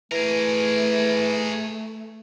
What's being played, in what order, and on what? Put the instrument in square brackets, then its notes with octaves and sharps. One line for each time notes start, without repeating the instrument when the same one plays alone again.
[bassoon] E3 [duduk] A3 [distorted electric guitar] G#4 A#4